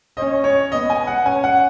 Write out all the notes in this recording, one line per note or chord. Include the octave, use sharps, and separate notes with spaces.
C#4 D#5
C#5
B3 D#5
G#5
F#5
C#4 G#5
F#5